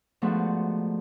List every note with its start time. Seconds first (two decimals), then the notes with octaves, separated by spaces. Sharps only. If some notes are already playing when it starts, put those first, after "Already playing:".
0.22 G#2 D3 F3 A3 B3 F#4